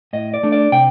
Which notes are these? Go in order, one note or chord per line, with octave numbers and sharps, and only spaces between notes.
A2 D#5
D5
A3 D4
D5
C3 G5